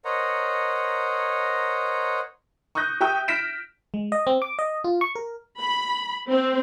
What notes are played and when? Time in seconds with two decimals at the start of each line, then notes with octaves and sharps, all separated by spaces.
0.05 A#4 C5 C#5 D#5 F#5 A#5
2.75 C#6 D#6 F#6 G6 A#6
3.01 G4 E5 G5 C#6 D#6 G6
3.28 F6 A#6 B6 D7 E7
3.94 G#3
4.12 D#5
4.27 C4
4.42 D6
4.59 D#5
4.84 F4
5.01 C#6
5.15 A#4
5.61 B5
6.28 C4